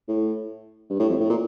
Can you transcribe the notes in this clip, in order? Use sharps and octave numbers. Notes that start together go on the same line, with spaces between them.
A2
G2
A2
F2
A2
A#2